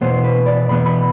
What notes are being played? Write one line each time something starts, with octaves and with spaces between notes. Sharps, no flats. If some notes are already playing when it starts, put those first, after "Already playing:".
E2 B2 B3 C5
B4
D5
E2 B2 B3 B5
B5